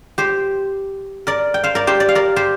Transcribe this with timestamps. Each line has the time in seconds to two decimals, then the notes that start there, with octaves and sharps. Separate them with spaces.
0.18 G4 C5
1.27 A#4 D5
1.54 G5
1.64 C5 F5
1.75 A#4 D5
1.87 G4 C5
2.00 D5
2.09 F5
2.15 A#4 D5
2.36 G4 C5